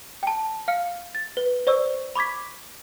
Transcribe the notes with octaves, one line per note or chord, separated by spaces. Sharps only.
G5 A5
F5 F6 C#7
A6
B4
C5 D5 C#6 E6
B5 C#6 D6 G#6 B6